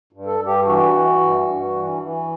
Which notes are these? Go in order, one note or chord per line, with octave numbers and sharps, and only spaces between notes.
G2
A4
G2
G4
E3 F#4
E3
G2
G2
E3
E3